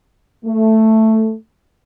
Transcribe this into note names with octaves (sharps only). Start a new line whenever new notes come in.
A3